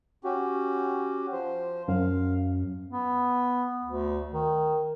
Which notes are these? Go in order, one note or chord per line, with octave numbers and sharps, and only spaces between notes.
C#4 F#4 G4
F3 C5
F#2 F5
B3
D2
D#3